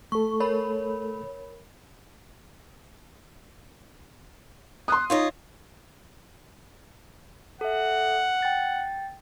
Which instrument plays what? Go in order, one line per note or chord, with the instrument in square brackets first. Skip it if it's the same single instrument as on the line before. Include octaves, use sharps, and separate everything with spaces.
[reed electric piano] A3 A4 [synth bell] C#6
[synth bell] A#4 C#5 B5
[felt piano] C6 D#6 [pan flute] F#6
[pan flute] D#4 [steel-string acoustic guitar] F4 C#5 D#5
[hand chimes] A4 E5 [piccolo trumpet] F#5
[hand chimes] G5 A6